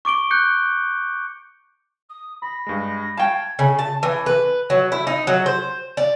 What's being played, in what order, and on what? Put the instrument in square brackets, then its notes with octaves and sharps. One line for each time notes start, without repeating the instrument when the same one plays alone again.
[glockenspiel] C#6 D6 D7 G7
F#6 G6 C#7
[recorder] D#6
[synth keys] B5 [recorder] A#6
[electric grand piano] G2 G#3
[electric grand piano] F5 C#6 A6 [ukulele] G5 A5 [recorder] G#6
[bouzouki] C#3
A5
E3
B4
F#3
E4
D#4
F#3
C5
D5